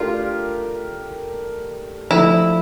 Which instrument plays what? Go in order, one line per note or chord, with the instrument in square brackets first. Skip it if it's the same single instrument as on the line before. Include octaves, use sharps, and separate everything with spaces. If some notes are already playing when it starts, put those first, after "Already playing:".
Already playing: [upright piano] A3 D4 G4 A#4 [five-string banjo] F4
[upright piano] F3 A3 D4 [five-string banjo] E4